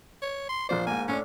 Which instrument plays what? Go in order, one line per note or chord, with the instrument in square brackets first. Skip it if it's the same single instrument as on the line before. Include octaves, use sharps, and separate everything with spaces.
[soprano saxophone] C#5
C6
[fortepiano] A#1 F3 D5 [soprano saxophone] C5
[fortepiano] G#2 A#3 [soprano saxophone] G#5
[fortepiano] A2 D4 [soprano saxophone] C#4